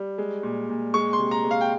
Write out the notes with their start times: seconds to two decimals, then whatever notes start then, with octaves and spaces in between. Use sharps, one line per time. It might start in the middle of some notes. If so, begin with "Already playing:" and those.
Already playing: G3
0.18 G#3
0.43 A#2
0.69 A#2
0.94 G#3 C#6
1.13 C6
1.19 C3
1.31 A#5
1.44 G#3
1.51 F5
1.61 G5